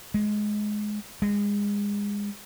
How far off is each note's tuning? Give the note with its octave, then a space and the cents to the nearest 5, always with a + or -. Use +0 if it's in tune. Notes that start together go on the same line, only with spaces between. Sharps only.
G#3 +15
G#3 -25